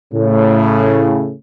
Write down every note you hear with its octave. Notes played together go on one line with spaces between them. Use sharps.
A2 C#3